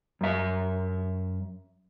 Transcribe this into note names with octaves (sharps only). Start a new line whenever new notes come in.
F#2 E5